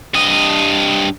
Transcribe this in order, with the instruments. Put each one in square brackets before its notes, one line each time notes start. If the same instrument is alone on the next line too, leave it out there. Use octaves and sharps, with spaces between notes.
[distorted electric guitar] G2 D#5